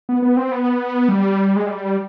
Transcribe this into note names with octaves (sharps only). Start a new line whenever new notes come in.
B3
B3
C4
B3
G3
G#3
G3